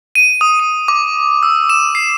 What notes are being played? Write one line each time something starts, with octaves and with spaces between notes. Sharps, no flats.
D#7
D#6
D#7
D6
E6
E7
C7